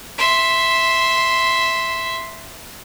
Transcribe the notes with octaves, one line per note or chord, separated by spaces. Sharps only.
E5 C6